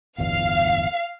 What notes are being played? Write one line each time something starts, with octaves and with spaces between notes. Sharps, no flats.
D1 G1 E2 F5